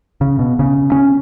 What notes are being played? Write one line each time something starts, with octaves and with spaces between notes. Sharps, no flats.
C#3
B2
C#3
C#4